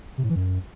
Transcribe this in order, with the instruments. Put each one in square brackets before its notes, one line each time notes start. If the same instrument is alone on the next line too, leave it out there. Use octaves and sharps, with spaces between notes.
[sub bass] C3
A2
E3
F#2